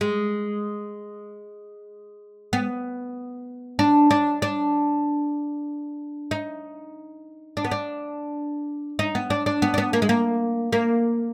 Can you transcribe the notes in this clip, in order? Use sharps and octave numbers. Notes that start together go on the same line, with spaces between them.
G#3
B3
D4
D4
D4
D#4
D4
B3
D4
D#4
B3
D4
D4
B3
D4
B3
A#3
G#3
A#3
A#3